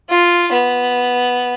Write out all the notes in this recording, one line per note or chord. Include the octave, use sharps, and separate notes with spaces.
F4
B3